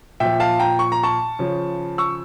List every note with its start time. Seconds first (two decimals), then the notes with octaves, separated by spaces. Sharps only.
0.20 A#2 F3 E5 G5
0.40 F5 A5
0.59 G5 A#5
0.79 C#6
0.92 A#5
1.03 A5 C#6
1.39 C#3 F3
1.98 C#6 E6